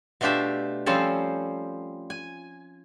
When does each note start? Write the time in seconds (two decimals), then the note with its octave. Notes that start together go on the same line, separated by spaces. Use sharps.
0.21 B2 A3 D4 F4 G4 E5
0.86 F3 G3 C4 C#4 A4
2.10 G#5